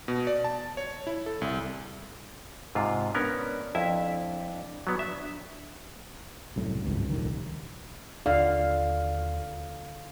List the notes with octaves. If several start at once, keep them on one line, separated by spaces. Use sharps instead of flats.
B2
D5
A5
C#5
E4
A4
C2
G#2 C3 F4
B3 C#4 D4 A#4
F2 E4 E5
F#3 B3
E5
C2 F#2 A2
G#1 C#2 G2
D#1 C2 F2 D#3
D#2 D3 F5